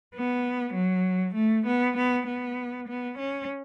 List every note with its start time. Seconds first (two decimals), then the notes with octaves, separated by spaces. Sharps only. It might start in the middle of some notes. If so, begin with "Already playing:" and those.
0.14 B3
0.75 F#3
1.35 A3
1.65 B3
1.96 B3
2.26 B3
2.87 B3
3.18 C#4